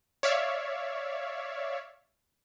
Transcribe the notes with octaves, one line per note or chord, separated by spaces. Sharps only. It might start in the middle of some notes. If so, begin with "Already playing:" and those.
C#5 D5 E5 F5